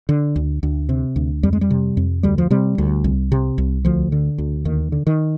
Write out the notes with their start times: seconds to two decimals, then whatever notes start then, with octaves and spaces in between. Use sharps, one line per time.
0.09 D3
0.36 D2
0.63 D2
0.89 C3
1.16 D2
1.43 F2 G3
1.53 G#3
1.61 G3
1.71 C3
1.97 F2
2.23 D2 G3
2.38 F3
2.50 C3 G3
2.78 D2
3.04 C2
3.32 C3
3.58 C2
3.85 D2 F3
4.12 D3
4.38 D2
4.65 D#2 D#3
4.92 D3
5.07 D#3